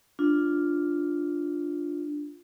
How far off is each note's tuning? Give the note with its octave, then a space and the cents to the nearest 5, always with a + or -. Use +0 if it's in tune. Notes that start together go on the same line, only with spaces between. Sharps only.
D4 +0 F4 +0